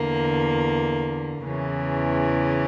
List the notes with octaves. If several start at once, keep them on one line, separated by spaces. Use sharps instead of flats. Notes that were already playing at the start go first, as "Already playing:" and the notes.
Already playing: E2 D3 A#3
E2 C#3 E3 C#4